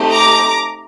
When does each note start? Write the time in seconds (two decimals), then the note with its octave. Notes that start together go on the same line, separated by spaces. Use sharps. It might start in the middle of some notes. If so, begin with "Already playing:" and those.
Already playing: A3 C4 D#4 G4
0.11 A#5 D6